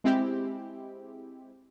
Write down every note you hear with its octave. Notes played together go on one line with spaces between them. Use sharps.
G#3 C4 E4 G4